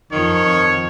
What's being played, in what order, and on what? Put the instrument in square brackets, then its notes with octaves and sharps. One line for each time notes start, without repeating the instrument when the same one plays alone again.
[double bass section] F2 F3 [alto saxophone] D#3 [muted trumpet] C#5